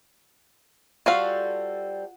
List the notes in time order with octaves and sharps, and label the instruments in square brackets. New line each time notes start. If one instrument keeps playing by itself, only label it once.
[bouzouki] G3 C4 A4 [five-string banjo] F4 F#4 F5